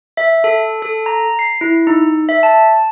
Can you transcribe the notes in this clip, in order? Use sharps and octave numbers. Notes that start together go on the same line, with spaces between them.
E5
A4
A4
A#5
C7
E4
D#4
E5
A5